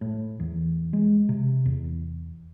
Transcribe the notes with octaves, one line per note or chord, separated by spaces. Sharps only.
A2
E2
G#3
C3
E2